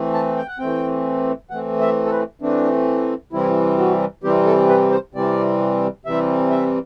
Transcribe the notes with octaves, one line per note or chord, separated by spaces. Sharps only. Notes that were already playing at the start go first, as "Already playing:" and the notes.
Already playing: E3 A3 C4
A5
G5
F#5
E3 A3 C4 G5
E3 A3 C4 F#5
E5
A4
B4
E3 A3 C4 D4
C3 E3 G3 C4 E4
F#4
C3 E3 G3 C4 G4
A4
B4
C5
C3 E3 G3 C4 D5
C3 E3 G3 C4 E5
E5